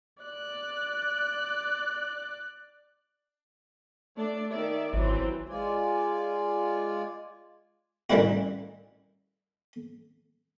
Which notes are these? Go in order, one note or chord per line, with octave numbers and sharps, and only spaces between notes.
D5 F#6
A3 D4 D5
D#3 D5 E5
G#1 E3 F#3 C4
G#3 F4 D5 G#5
A1 D#3 E3 G3 E4 F#4